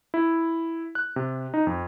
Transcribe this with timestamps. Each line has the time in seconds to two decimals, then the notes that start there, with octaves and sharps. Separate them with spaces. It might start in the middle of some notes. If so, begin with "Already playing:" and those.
0.14 E4
0.95 F#6
1.16 C3
1.54 D#4
1.67 F2